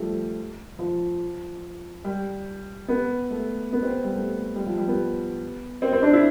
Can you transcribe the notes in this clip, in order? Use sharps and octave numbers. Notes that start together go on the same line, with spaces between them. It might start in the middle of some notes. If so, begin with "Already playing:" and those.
Already playing: F3 G3 A3
F3
G3
B3
A3
B3
C4
G3
A3
G3
F3
G3
B3
C4
C4
D4
E4